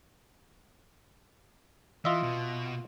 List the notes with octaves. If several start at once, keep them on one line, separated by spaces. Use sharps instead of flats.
E3 F4 D#5 E5
B2